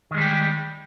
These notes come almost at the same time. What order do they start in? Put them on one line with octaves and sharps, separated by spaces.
D#3 G#3 G3 G4